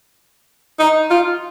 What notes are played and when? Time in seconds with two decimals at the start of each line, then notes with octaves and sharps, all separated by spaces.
0.79 D#4
1.10 F4